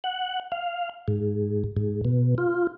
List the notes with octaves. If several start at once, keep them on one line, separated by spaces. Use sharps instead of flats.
F#5
F5
G#2
G#2
B2
F4